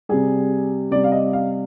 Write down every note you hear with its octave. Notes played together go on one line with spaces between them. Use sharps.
C3 G3 G#4
C3 G3 D5
F5
D#5
F5